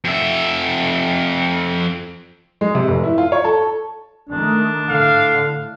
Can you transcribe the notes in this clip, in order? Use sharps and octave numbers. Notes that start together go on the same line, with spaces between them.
F2 E5
G#3
C3
F1
E4
F4
C#5
A4
D#3 A3 D4
A2 D3 F5